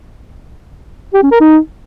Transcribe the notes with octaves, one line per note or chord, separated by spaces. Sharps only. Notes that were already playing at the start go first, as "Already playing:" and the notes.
G4
C#4
A#4
D#4